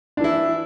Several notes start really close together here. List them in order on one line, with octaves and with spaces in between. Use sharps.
D4 E3 E4